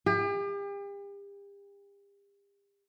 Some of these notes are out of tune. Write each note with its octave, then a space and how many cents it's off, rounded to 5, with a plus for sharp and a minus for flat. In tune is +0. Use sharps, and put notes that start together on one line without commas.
G4 +40